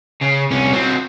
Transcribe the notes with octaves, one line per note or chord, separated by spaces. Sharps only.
C#3
C2 C#4
F#3 C4